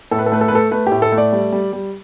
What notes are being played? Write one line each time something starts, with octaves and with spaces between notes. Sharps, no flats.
A2 A4
B4
A4
A3 B4
A4
B4
A3 A4
A3 B4
A2 G4
A4
A3
D5
G3
G3
G3